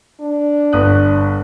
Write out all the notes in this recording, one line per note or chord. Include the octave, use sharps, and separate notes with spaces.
D4
G1 D#6 F#6